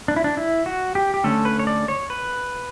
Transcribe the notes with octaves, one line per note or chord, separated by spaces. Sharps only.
D4
E4
D4
E4
F#4
G4
G4
D3 A3 C#4 A4
B4
C#5
D5
C#5
B4